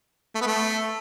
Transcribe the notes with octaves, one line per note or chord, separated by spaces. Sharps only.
A3
B3
A3